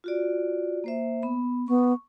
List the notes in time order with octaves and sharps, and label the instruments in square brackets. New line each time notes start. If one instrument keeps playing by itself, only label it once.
[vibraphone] F4 F#4 D5
A#3 C5 E5
B3 B5
[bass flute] B3 [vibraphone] C#6